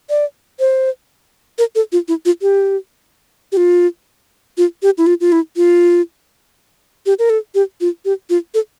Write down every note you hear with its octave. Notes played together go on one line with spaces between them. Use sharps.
D5
C5
A#4
A4
F4
E4
F4
G4
G4
F4
F4
G4
E4
F4
F4
E4
F4
G4
A#4
A4
G4
F4
G4
F4
A4